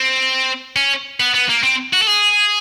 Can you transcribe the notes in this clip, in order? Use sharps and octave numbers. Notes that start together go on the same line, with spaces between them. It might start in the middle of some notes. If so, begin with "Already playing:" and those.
Already playing: C4
C#4
B3
B3
A#3
C4
F#4
A4
G#4